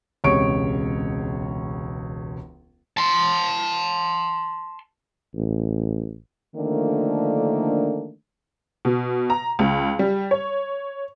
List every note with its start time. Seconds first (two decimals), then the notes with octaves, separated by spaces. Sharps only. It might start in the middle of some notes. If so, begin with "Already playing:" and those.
0.24 E1 C#2 C3 C#5 C#6 D7
2.97 A5 C6
5.35 A1
6.56 D3 D#3 F3 A3 A#3 D4
8.85 B2
9.30 A#5
9.59 C#2
9.99 G3
10.31 C#5